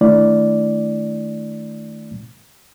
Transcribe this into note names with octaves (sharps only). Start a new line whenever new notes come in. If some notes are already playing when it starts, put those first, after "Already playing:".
D#3 A3 D4 E4 D5